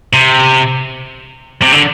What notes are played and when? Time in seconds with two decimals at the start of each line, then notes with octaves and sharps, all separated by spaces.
0.14 C3
1.62 C3
1.72 D3